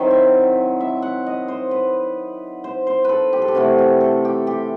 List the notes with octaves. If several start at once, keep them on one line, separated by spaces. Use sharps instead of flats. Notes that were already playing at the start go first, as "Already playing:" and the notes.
Already playing: D#3 F#3 C4 E4 C5
E5
E5
F#5
D#5
C5
B4
C5
C5
A4 B4
G4
A4
G4
C3 E3 A3 C4 F#4
G4
A4
G4
G4